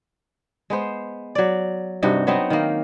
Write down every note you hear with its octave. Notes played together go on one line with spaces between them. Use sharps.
G#3 B3 C5
F#3 D5
G2 C3 D#4 F#4
F#3 B3 C4 D#4
D#3 A#3